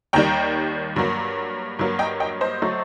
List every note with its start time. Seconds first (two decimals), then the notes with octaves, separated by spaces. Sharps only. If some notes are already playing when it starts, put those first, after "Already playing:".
0.13 D#2 D#3 G3 G5 A#5
0.96 G2 F#3 A#3
1.79 G2 F#3 A#3
1.99 D#5 G5
2.20 D#5 G5
2.41 C5 D#5
2.62 F#3 A3